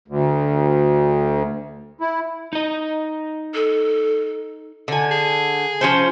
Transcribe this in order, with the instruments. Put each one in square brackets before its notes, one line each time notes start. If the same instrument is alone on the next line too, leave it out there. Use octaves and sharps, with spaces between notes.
[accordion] D2
E4
[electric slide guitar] D#4 D#5
[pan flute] A4
[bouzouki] D3 G#5
[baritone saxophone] G#4
[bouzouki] F3 C#4 C5